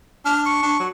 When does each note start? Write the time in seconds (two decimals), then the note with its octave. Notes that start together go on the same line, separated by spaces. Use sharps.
0.25 D4 F6
0.45 C#6
0.62 D4
0.80 F#3